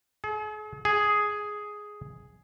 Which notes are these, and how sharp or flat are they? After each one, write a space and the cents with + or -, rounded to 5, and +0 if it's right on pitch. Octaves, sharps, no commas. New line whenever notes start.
G#4 +45
G#4 +5